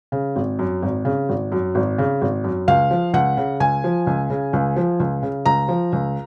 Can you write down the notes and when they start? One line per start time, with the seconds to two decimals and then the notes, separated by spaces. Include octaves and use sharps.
0.12 C#3
0.36 G#1
0.59 F#2
0.82 G#1
1.05 C#3
1.29 G#1
1.52 F#2
1.75 G#1
1.98 C#3
2.21 G#1
2.44 F#2
2.68 C#2 F5
2.91 F3
3.13 C#2 F#5
3.37 C#3
3.60 C#2 G#5
3.84 F3
4.07 C#2
4.30 C#3
4.53 C#2
4.76 F3
5.00 C#2
5.23 C#3
5.46 C#2 A#5
5.68 F3
5.93 C#2